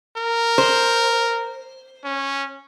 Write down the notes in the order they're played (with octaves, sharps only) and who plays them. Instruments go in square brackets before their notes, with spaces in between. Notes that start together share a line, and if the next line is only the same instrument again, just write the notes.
[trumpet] A#4
[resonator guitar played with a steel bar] C5
[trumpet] C#4